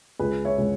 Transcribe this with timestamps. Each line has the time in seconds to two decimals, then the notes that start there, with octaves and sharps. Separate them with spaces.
0.19 C#2 G#4 B4
0.45 C#5 E5
0.58 C#3 G#3